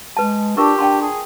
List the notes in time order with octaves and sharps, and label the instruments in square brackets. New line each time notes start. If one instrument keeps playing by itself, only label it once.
[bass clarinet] G#3 [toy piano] B4 A5
[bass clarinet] D4 [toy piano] F4 A#4 C#6 [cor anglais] G4
[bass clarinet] D4 [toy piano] G5 A5 C6
[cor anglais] G#4